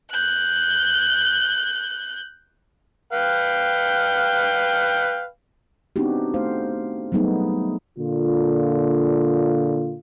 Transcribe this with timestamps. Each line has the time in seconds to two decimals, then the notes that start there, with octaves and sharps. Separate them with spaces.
0.11 F#6 G6
3.13 B4 F5 G5
5.96 B3 C4 D4 D#4 F#4 G4
6.34 A3 C5 F5
7.12 F#3 G3 A3 B3 D#4 G#4
7.98 A#2 D3 F4